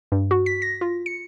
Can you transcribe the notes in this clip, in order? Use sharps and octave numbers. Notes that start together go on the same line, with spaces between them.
G2
F#4
B6
A#6
F4
C#7